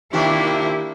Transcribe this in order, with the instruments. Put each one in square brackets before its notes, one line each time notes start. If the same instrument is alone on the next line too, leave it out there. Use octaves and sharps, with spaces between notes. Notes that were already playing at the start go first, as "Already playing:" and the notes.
[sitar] C3 D#3 F4 [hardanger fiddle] A#3 D4 [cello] E4 [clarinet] G4